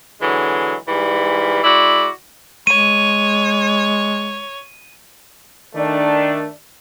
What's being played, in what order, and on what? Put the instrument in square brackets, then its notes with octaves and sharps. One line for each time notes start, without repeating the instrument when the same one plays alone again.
[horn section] D3 E3 F#3 G#3
G#2 E3 G3
G#3 E4 F#4 D5
[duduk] G#3 [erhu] C#5 [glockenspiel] D#7
[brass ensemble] D#3 A3 D4